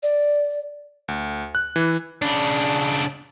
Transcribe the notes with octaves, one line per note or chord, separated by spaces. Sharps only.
D5
D2
F#6
E3
C#3 D4